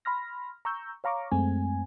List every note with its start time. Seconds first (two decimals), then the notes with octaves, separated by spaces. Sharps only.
0.05 B5 C6 F6 A#6
0.65 A#5 C#6 E6 G6
1.04 C#5 F5 A#5 C#6 D6
1.32 F#2 G#3 A3 C4 G#5